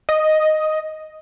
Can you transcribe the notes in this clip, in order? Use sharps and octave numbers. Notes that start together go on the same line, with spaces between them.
D#5